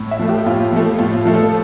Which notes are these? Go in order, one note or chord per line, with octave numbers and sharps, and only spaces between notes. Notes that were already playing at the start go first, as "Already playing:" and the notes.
Already playing: A2
E5
F3 A3
G4
A2 F4
F3 A3
A2 F4
F3 A3
A4